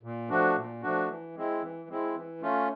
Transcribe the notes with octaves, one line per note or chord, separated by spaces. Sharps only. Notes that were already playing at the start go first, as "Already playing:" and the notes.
A#2
F3 A3 D4 F#4
A#2
F3 A3 D4 F#4
E3
G#3 C4 E4
E3
G#3 C4 E4
E3
A3 C#4 F4